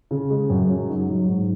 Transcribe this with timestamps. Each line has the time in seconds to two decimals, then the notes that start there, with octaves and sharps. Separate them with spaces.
0.11 C#3
0.30 G#3
0.50 F#2
0.69 F#3
0.89 D#4
1.08 F#3
1.28 G#2